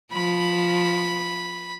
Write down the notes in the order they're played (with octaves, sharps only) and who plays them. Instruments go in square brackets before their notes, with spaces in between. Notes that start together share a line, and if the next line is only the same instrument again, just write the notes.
[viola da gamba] F3 [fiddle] B5